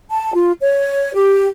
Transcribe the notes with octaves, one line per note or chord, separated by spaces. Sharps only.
A5
F4
C#5
G4